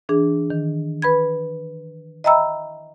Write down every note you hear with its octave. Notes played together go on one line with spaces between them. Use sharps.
E3 D4 G#4
D#3
B4 B5 G#6
D#5 E5 G5 A#5 B5 E6